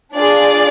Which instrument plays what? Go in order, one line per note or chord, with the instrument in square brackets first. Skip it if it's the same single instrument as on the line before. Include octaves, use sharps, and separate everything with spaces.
[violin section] D4 F4 G#4 D5